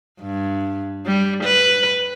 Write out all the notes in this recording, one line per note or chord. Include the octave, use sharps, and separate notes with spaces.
G2
G3
B4